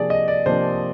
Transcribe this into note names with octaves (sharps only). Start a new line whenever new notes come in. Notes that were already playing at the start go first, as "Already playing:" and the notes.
Already playing: C3 F3 A#3 D4 G#4 D5
D#5
D5
C3 F3 A#3 D4 C5